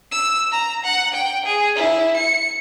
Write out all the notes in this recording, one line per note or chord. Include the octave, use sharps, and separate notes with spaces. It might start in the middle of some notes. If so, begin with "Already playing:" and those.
E6
A#5
F#5
G5
G#4
E4
C#7